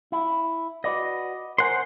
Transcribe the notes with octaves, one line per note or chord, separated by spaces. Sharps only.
E4
F#4 B4 D5 D#5
A#4 C5 F#5 G#5 C6